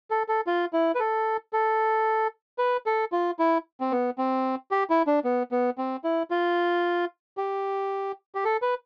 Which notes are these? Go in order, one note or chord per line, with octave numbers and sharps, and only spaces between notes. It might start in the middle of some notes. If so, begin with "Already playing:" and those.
A4
A4
F4
E4
B4
A4
A4
B4
A4
F4
E4
C4
B3
C4
G4
E4
D4
B3
B3
C4
E4
F4
G4
G4
A4
B4